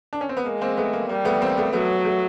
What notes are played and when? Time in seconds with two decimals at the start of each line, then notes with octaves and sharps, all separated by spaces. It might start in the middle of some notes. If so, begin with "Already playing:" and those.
0.13 D4
0.21 C#4
0.29 C4
0.37 B3
0.45 G#3 A#3
0.61 A#3 C4
0.77 A3 B3
0.93 A#3
1.09 G3 A#3
1.25 A3 B3
1.41 A#3 C4
1.57 A3 B3
1.73 F#3 A3 B3
2.05 A3